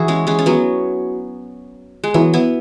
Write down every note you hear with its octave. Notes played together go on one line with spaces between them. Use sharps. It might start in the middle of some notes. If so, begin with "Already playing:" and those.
Already playing: E3 E4 F#4 G#4
G#3 C#4
G#3 C#4
C#4
F#3 B3
G#3
E3 F#3 B3
B3 E4